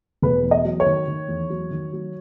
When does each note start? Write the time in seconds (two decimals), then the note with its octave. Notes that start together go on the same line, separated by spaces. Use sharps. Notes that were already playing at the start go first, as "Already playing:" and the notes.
0.22 E1 B4
0.44 E2
0.51 D#5
0.65 F#3
0.80 C#5
0.86 D#3
1.08 D#3
1.29 E2
1.50 F#3
1.71 D#3
1.93 F#3